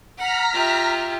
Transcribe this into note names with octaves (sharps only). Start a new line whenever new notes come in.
F#5 A#5 F6 B6
F4 G4 E5